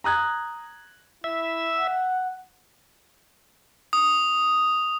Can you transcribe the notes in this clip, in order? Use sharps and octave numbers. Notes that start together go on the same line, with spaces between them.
A#5 D#6 F#6 G#6
E4 E5
F#5
D#6